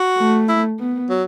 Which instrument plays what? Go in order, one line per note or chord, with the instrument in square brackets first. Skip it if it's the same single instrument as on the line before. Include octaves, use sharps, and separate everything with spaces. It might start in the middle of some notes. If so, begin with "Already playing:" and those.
Already playing: [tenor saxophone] F#4
[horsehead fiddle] A3
[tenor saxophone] E4
[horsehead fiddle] B3
[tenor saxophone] F#3